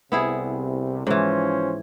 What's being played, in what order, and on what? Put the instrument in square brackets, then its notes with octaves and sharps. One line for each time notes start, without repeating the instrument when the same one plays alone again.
[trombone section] C2 C3 [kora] B3 E4 G#4
[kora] G#2 E3 [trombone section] F3 C#4 C5